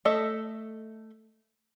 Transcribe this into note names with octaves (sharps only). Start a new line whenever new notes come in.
A3 A4 D#5 E5